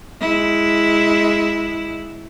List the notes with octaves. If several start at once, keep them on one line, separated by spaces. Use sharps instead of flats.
G#3 E4